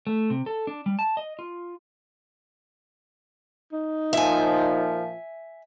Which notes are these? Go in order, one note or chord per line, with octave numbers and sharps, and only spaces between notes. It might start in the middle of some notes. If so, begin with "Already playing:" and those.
A3
C3
A4
D4
G3
A5
D#5
F4
D#4
A#2 F3 E5 G#5